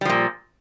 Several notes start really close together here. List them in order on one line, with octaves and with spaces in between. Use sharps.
G3 F3 A#2